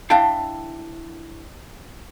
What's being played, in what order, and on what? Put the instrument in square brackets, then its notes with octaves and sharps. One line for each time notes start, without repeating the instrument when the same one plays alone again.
[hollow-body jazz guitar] D4 E4 F5 G5 A5